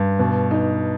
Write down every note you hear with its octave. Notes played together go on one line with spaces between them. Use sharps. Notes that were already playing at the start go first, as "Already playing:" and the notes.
Already playing: G2
B2
D#4